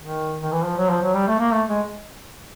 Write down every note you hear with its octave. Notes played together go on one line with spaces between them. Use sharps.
D#3
D#3
E3
F3
F#3
F3
F#3
G3
A3
A#3
A3
G#3